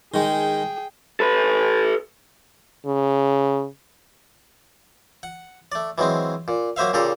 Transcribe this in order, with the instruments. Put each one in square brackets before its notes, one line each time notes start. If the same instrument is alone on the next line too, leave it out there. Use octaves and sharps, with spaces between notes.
[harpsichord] D#3 G#3 [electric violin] G#4 G5
[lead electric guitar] A4 B4
[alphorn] C#3
[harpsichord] F#5
A3 D5
E3 F#3 G#3 C4
A#2
F#3 A#3 C5 E5 F5
A#2 C#3 G4 A4 A#5 C6